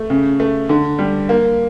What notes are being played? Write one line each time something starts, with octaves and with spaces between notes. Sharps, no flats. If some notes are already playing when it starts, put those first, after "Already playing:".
Already playing: A3
C#3
A3
D3
G3
A#3